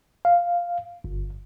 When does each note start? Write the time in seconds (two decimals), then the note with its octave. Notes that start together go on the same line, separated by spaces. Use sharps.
0.25 F5
1.04 G1